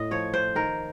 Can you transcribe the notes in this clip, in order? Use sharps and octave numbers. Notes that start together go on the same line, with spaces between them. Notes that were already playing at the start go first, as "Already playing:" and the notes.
Already playing: A2 D#5
F3 C#5
C5
D#3 A#4